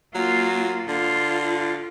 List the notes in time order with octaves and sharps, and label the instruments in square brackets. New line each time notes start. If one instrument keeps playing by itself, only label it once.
[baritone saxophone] F#3 [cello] A#3 F4
[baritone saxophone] D3 [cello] F4